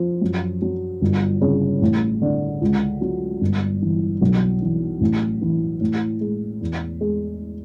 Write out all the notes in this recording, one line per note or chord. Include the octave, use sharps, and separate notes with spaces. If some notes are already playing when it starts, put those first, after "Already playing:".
Already playing: F3
F#2
F#3
G1
C#3
A1
D3
C#2
F#3
G1
E3
B1
E3
A1
E3
A2
G#3
E2
G#3